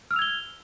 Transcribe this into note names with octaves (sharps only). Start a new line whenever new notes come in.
E6 F6 G#6 F7 G7